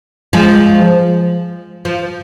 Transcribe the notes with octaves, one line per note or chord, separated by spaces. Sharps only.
F3 G#3
F3